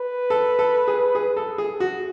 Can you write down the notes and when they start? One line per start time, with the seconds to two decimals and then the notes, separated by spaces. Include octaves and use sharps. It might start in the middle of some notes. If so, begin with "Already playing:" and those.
Already playing: B4
0.30 A4
0.59 A4
0.88 G#4
1.15 G#4
1.37 A4
1.58 G#4
1.80 F#4